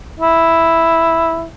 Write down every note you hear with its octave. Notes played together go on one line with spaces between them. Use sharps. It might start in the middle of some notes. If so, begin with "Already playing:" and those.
E4